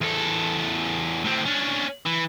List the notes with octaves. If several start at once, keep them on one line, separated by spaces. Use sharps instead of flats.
E2 A4
A2 C4
C#4 D4
E3